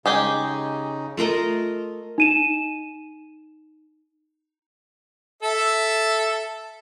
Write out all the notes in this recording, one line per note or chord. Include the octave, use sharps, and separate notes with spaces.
C#3 G#3 D#4 G4 G#4
A3 F4 A#4 D#5
D#4 D#7 E7
A4 E5